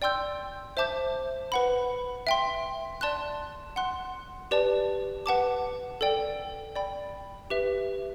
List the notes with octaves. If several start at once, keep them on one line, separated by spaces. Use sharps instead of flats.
D5 G5 C6 E6 G6
C5 E5 A5 D6 G6
B4 F#5 B5
E5 G5 C6
D5 A5 C6 F#6
F#5 C6 F#6
G4 B4 D5 A5
B4 F#5 A5 D6
A4 D5 G5
D5 G5 B5
G4 B4 E5